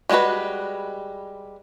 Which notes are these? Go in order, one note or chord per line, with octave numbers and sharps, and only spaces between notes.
G3 G#3 B3 F#4 B4